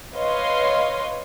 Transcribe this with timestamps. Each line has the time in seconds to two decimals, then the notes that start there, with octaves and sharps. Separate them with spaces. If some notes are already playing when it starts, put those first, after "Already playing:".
0.15 B4 C#5 D#5 F5 C6